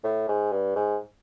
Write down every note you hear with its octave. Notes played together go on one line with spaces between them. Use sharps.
A2
G#2
G2
G#2